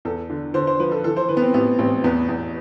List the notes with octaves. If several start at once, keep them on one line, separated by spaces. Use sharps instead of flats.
E2 A4
D3
D3 C5
C5
F3 B4
A4
E3 A4
C5
E3 B4
B3
C4
A1 B3
A1 C4
E2 B3
E2